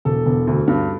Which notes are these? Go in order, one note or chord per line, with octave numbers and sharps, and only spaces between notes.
E1 A4
E1
D2
G2